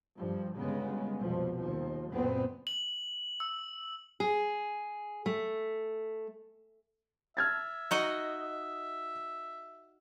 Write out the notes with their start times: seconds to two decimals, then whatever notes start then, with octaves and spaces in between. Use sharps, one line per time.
0.16 G2 F3
0.55 G1 C#3 G#3 B3
1.18 C2 F2 B2 F3
1.56 D#2 F3
2.12 F#1 D2 A#2 B3 C4
2.67 F#7
3.40 E6
4.20 G#4
5.26 A3
7.37 E5 F6 G#6 A6
7.91 D#4 F#4 D#5